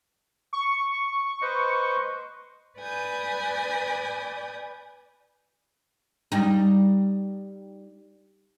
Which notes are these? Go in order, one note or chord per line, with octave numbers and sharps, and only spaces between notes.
C#6
B4 C5 D#5
B4 D5 G#5 D#6 G6
G3 D#4